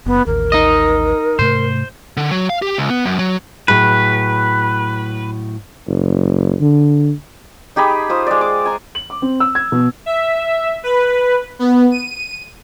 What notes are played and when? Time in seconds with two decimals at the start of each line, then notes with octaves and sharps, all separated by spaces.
0.06 F#1 B3
0.27 A1 D#2 A#4
0.52 D#4 D#5
1.39 G#2 C3 A3 C5
2.17 D3
2.31 F#3
2.49 F5
2.62 G4
2.78 C#2
2.90 B3
3.06 F#2
3.19 F#3
3.68 A2 F#3 G#4 B4
5.88 F#1
6.61 D3
7.76 D#4 G4 G#4 B5
8.09 F4 C5 D#6
8.27 G#3 D5
8.41 D6
8.66 G#5 A#5
8.95 F#7
9.10 D6
9.22 C4
9.40 E6
9.55 G#6
9.72 B2
10.06 E5
10.83 B4
11.59 B3
11.91 D#7